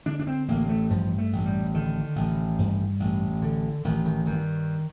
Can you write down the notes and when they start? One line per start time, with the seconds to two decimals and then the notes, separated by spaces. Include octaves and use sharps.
0.06 D3 D4
0.20 D4
0.27 C4
0.48 A1 A#3
0.69 A3
0.90 G2 F3
1.18 A3
1.33 A1
1.46 G3
1.74 D3 D#3
2.16 A1
2.59 G2
3.00 A1
3.42 D3
3.84 A1 D#3
4.05 D#3
4.26 G2 D#3